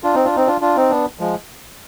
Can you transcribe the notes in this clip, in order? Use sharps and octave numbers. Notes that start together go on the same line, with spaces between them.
D4 F4
C4 D#4
D4 F4
C4 D#4
D4 F4
D4 F4
C4 D#4
B3 D4
F3 G#3